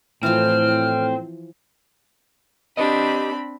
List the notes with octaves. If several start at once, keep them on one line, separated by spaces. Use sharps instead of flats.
A2 E3 F3 C4 F6
C4 D4 G4 B4 D#5 B5